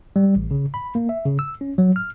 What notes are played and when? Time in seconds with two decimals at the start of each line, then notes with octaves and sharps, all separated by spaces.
0.16 G3
0.36 A1
0.51 C#3
0.74 B5
0.95 A#3
1.09 E5
1.25 C#3
1.39 E6
1.61 C#4
1.78 F#3
1.96 F6